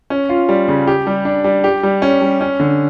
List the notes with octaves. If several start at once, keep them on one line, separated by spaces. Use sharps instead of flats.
C#4
F4
G3
C#3
G4
G3
D4
G3
G4
G3
C#4
G3
C#4
D3